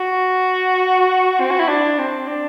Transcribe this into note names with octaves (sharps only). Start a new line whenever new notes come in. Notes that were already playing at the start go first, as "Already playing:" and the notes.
Already playing: F#4
C4
F#4
E4
D4
C4
D4